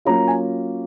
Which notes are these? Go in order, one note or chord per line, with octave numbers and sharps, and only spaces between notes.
F#3 A#3 C#4 F4 A#5
G#5